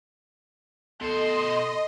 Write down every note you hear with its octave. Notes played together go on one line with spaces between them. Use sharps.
B2 A4 C5 D#5 C6